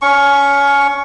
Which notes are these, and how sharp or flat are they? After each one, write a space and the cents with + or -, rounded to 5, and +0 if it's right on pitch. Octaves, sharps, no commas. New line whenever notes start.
C#4 +25 C#6 +0